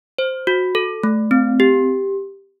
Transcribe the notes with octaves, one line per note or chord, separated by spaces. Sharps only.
C5
F#4
A4
A3
C4
G4